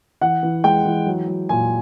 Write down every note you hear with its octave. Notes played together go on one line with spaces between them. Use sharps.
E3 F#5
E3
G#3 G5
E3
F#3
F#3
A#2 G#5